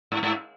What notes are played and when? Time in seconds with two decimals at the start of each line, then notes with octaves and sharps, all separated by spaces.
0.12 G#2
0.23 G#2